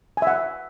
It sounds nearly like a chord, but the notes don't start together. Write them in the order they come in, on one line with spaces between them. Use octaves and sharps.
G#5 E5 F#5